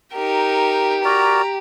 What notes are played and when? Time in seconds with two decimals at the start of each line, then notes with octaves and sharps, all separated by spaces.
0.15 D#4 G4 A#4
1.05 F#4 A#4 D5 A#5